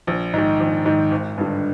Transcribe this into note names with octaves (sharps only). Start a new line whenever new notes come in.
A#1
G#2 D#3
A#1
G#2 D#3
G#1
G2 D3